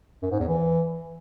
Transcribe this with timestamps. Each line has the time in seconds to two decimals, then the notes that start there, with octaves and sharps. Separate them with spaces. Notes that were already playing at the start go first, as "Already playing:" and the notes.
0.23 F#2
0.31 G#2
0.39 E2
0.48 E3